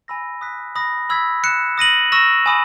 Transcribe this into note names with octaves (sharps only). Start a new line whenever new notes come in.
G#5 B5 E6 A#6
D#6 F#6 B6
B5 D#6 A#6
B5 E6 G#6 B6
F#6 C#7 E7
D#6 A#6 D#7 F#7
C#6 E6 A#6 E7
G#5 B5 D#6